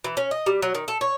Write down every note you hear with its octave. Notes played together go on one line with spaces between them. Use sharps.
E3
C#4
D#5
G3
F#3
D#3
A4
C#5